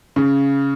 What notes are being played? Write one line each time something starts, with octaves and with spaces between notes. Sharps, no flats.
C#3